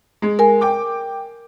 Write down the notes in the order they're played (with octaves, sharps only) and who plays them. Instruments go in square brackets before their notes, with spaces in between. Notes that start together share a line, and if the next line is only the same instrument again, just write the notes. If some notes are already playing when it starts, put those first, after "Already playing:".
[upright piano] G#3
[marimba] A#4 G#5
[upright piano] G5 D6